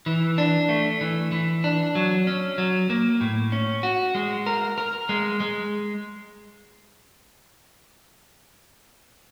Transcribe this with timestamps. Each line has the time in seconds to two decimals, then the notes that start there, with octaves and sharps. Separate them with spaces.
0.06 E3
0.38 D4
0.69 A3
1.01 E3
1.32 E3
1.64 D4
1.95 F#3
2.27 C#4
2.58 F#3
2.90 A#3
3.21 A2
3.52 C#4
3.83 F#4
4.15 G#3
4.47 A#4
4.78 A#4
5.09 G#3
5.40 G#3